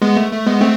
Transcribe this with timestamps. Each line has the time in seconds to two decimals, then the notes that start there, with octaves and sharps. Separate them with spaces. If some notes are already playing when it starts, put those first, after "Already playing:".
0.02 G#3 B3
0.17 A3
0.32 A3
0.46 G#3 B3
0.61 A3 C4